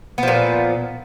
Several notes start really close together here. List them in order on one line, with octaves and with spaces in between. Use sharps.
B3 F3 A#2